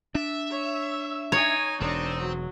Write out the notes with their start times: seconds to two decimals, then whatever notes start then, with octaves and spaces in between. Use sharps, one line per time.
0.15 D4 E5
0.51 C#5
1.32 D#4 C#5 G#5
1.81 E1 C4 D4 D#4
2.20 F#3